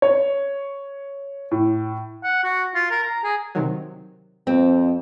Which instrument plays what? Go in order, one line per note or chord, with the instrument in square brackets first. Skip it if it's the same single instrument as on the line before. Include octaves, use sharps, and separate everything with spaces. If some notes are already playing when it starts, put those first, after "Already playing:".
[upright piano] C#5
A2
[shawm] F#5
F#4
F4
A#4
A#5
G#4
[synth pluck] C3 D#3 F#3
[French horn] F2 [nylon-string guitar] C4